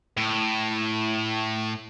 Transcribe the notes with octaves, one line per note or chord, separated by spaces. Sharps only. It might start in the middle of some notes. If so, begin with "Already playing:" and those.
A2